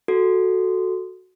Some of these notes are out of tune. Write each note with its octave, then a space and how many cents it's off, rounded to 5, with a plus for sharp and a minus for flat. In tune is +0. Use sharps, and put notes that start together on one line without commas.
F#4 +0 A4 +0